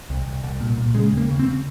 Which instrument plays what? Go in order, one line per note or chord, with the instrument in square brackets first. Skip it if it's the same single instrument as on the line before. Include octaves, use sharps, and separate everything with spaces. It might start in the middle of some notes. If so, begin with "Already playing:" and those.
[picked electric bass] C2
C2
C2
A#2
A#2
C#3 G#3
D#2 A#3
C#3
C4
C#3